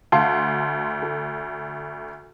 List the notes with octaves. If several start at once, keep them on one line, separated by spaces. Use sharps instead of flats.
D2 F5 A5 C6
A4